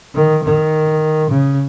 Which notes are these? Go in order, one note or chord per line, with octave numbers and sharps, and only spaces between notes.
D#3
D#3
C#3